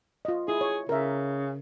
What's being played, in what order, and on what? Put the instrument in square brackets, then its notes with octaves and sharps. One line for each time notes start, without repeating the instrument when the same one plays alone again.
[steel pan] F4 D#5
[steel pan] E4 [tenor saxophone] G#4
[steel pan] C#5
[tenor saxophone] C#3 [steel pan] A#4 E5